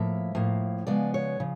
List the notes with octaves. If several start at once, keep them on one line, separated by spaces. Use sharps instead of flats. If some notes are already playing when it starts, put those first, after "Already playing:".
Already playing: A2 F3 A#3 E5
A2 F3 A#3
C#3 F3 G#3 B3 D5
C#5
C#3 F3